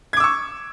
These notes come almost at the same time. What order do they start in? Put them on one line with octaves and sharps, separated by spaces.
G#6 D6 E6 C#6